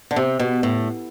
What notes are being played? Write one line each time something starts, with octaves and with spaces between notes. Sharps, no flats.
D3
C3
B2
A2